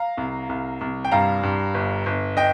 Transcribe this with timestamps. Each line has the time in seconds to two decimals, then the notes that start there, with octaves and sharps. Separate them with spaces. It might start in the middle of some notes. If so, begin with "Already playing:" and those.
Already playing: F5 A#5
0.17 C2
0.49 C2
0.81 C2
1.05 G5
1.12 G2 F5 A#5
1.43 G2
1.74 G1
2.06 G1
2.37 D#5 G5